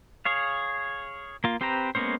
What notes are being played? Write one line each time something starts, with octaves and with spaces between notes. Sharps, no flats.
G#4 C#5 F5
A#3 F4
C4 G4 B4 C5 A#5
G#3 A#3 B3 C#4 C5